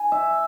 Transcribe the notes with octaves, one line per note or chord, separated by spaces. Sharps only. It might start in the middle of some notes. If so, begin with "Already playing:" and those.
Already playing: G#5
E5